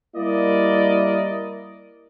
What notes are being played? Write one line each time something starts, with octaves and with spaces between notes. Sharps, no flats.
G3 A#3 E4 A#4 D5 D#5